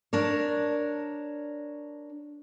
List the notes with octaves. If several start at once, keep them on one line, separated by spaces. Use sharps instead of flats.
D4 A#4 C#5